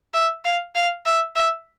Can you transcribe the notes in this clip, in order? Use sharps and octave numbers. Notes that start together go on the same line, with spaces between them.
E5
F5
F5
E5
E5